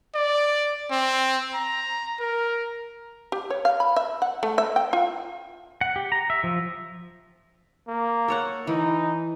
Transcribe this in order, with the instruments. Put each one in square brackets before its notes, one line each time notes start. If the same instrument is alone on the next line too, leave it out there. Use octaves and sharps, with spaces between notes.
[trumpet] D5
C4
A#5
A#4
[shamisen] G4
C#5
F5
B5
E5
F#5
A3
E5
G5
F4
[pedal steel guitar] F#5
G4
A#5
E5
F3
[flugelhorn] A#3
[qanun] A4 C#5 F#5
[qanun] E3 [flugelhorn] D#4